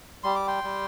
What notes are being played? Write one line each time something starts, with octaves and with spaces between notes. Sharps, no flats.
G3 C6
D6
G5 C6
G3